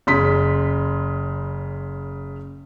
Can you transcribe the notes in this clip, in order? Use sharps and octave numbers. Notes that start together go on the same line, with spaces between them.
F#1 C#3 C6 B6